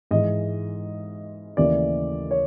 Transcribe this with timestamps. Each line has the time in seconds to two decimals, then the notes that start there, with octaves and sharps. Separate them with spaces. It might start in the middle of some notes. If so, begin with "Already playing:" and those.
0.11 G#2 E3 G#3 D#5
1.57 D#2 C#3 E3 A3 D5
2.31 C#5